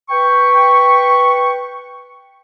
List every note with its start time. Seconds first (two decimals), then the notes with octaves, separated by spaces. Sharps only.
0.10 B4 G5 C#6